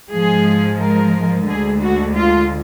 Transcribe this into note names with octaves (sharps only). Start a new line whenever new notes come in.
G#2 F3 G#3 G#4
A#4
D2 D3 G#3 G#4
F#4
F4